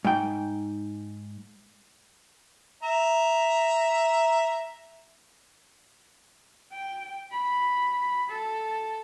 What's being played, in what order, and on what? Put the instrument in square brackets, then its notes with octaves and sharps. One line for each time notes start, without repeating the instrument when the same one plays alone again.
[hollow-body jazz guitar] G#2 G5
[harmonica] E5 A#5
[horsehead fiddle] G5
B5
A4